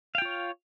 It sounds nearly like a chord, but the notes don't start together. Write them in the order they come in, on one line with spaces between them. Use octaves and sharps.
F5 G5 F4 C#5